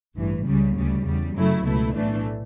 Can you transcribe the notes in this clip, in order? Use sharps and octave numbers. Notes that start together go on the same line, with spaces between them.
A1 G2 E3
C#2 C#3 G3
D2 C#3 G3
E2 C#3 G3
F#2 C#3 F#3 A3 E4
C#2 B2 A3 E4
B1 A2 E3 A3 D4